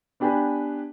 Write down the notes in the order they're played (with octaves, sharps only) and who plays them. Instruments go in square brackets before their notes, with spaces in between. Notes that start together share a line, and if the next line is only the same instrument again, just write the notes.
[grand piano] B3 D4 G4 B4 G#5